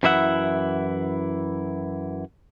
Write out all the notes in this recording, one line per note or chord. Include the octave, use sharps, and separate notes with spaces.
F#2 E3 E4 E5 F#5